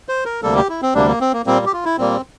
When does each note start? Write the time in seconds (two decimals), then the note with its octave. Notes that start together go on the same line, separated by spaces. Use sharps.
0.09 C5
0.25 A#4
0.43 D2 C3 G3 A#3 A4
0.56 G4
0.69 E4
0.82 C4
0.94 D2 C3 G3 A#3 D4
1.08 A#3
1.21 C4
1.33 A#3
1.46 A#2 G3 A#3 C4
1.66 G4
1.73 F4
1.85 E4
1.98 A#2 G3 A#3 C4